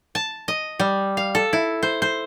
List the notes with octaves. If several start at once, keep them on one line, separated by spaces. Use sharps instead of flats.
A5
D#5
G3
F5
A4
E4
C5
C5